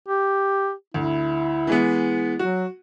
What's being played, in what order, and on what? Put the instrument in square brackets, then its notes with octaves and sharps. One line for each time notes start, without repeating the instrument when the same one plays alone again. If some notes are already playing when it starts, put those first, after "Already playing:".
[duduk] G4
[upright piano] D2 [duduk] E4
[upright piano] E3 G#3 B3
[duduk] F#3 [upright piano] F#4